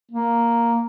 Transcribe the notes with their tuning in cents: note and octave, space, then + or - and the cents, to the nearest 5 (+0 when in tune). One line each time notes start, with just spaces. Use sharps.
A#3 +0